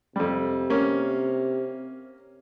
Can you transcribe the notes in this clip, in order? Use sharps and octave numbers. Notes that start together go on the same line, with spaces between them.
F2 C3 G3
A#3 C#4